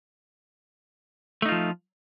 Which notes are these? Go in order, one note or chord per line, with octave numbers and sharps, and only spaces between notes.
F3 A3 D#4 F4